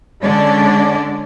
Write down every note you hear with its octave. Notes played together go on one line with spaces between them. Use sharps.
D3 G#3 C#4 D4 D5